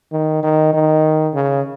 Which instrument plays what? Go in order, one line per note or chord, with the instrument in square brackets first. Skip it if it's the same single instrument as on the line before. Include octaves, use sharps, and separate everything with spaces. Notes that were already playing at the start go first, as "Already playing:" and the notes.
[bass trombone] D#3
D#3
D#3
C#3